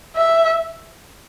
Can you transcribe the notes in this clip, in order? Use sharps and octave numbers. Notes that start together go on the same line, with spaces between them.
E5